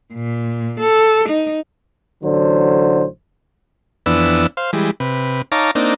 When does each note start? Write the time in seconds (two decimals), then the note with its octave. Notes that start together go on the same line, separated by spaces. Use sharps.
0.14 A#2
0.80 A4
1.29 D#4
2.24 A1 D3 F#3 C5
4.06 F2 E3 B3 D4 E6
4.57 C5 F5
4.73 E3 G3 G#3
5.00 C3 B4
5.52 D#4 C#5 F5 A5 A#5 D6
5.75 A#3 C4 D4 D#4